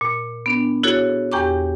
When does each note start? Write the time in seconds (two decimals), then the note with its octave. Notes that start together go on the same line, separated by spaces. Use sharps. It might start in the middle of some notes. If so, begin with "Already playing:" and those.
0.01 A#2
0.46 B3 D4
0.83 E4 F#4 G#4 A4 C#5
1.32 E2 G4 G5 A#5 C#6 D6